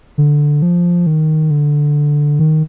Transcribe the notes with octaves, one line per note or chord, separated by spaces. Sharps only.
D3
F3
D#3
D3
D#3